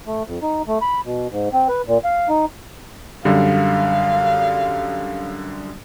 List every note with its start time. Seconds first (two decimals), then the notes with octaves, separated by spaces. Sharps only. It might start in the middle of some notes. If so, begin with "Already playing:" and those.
0.07 A3
0.26 F2
0.42 D#4
0.68 A3
0.82 B5
1.05 B2
1.31 G#2
1.53 C4
1.69 B4
1.87 A#2
2.04 F5
2.29 D#4
3.25 F#2 D3 G3 F5